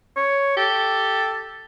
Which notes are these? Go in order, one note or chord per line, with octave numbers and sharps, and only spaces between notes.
C#5
G4 A4